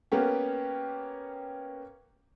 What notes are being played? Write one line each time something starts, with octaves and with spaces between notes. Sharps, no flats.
A#3 B3 C#4 G4